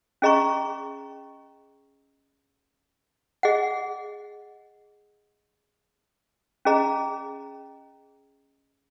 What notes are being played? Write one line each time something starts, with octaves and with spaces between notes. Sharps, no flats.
C#4 G#4 D#5 A#5 C#6
G#4 D#5 F#5
C#4 G#4 D#5 A#5